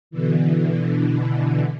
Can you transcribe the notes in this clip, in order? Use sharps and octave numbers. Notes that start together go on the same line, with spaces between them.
B2 D3 E3